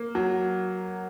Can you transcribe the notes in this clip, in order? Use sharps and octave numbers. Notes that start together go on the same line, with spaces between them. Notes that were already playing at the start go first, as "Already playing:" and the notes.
Already playing: A#3
F#3